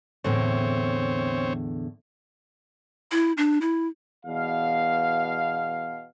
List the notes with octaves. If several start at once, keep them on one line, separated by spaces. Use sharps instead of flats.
E2 A2 D3 C4 C#5
E4
D4
E4
E2 B2 F5